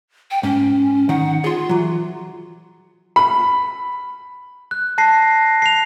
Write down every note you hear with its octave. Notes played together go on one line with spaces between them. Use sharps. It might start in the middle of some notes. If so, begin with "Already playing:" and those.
G5
G#2 C#4
D#3 D#4 F#5
F4 G#4 C6
E3 F#3
B5
F#6
A5 A#6 C7
C7 F7